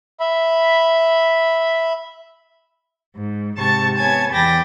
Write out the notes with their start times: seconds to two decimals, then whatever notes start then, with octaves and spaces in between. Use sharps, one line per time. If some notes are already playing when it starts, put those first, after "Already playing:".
0.20 E5 B5
3.15 G#2
3.57 G#2 C3 A5 C#6 A6
3.96 B3 C#5 G#5 A5 G#6
4.32 E2 G5 B5 D6 A6 A#6